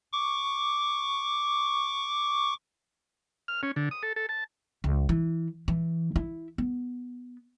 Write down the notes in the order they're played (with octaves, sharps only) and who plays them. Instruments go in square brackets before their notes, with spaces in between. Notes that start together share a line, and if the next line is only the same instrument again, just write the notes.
[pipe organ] C#6 D6
[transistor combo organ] F6
C#4
D3
D#6
A4
A4
A5
[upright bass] C#2
E3
E3
E4
B3